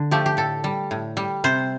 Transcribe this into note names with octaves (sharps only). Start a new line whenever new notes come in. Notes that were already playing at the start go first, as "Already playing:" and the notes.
Already playing: D3
F3 A3 G4
G4
A2 A4
G3
A2
G3
C3 C5